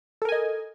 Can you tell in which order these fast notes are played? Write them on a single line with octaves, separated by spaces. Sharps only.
A4 A#4 G#5 D#5